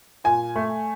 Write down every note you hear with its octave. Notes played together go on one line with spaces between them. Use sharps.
A#2 G#5
A3